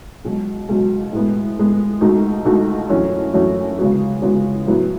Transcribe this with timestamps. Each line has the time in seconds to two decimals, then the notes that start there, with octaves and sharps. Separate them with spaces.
0.25 C#2 B2 F#3
0.69 C#2 B2 F#3
1.12 A2 G#3 B3
1.57 A2 G#3 B3
2.01 C#2 B2 A3 D#4 F#4
2.45 C#2 B2 A3 D#4 F#4
2.89 F#2 E3 A3 C#4 F#4
3.33 F#2 E3 A3 C#4 F#4
3.79 C#3 G#3 B3 F#4
4.22 C#3 G#3 B3 F#4
4.66 A2 F#3 B3 E4